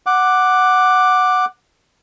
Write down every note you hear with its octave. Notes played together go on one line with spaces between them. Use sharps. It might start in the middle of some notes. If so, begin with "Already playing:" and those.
F#5 D6